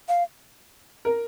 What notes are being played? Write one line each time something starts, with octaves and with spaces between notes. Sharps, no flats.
F5
A#4